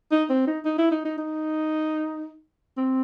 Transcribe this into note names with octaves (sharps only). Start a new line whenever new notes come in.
D#4
C4
D#4
D#4
E4
D#4
D#4
D#4
C4